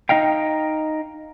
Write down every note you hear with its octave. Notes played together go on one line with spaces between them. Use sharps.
D#4 D#5 F5 G5